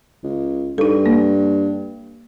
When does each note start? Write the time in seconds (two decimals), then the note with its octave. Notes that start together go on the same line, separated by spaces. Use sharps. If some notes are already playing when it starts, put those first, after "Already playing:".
0.23 C#2
0.78 G2 D#4 A4
1.06 A#3